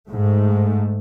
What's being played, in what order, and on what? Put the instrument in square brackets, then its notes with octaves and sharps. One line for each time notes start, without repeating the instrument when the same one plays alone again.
[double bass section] G#2 A3